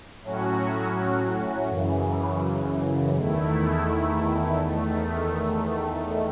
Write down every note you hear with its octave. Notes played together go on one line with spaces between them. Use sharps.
A2 F#3 C#4 F#4
F#2 C#3 E3
E2 D#3 A3 E4
E2 D#3 A3